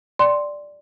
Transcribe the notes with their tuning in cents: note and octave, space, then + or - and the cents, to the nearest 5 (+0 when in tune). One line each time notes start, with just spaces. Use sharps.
D5 +0 G5 +0 C6 +0